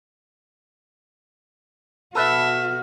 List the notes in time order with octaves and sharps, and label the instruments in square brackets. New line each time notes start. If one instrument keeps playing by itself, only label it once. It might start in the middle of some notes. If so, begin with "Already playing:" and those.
[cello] B2 F#4 [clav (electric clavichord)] A4 B4 [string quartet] E5 [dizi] F6